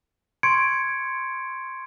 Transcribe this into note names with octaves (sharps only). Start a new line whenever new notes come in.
C6 C#6 G#6 C#7 D7